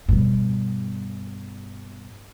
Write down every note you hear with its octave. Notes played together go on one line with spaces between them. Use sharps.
G2 B2